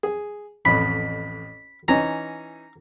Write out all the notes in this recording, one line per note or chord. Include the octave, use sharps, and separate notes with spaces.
G#4
A1 F2 B5
E3 C#4 D#4 A#5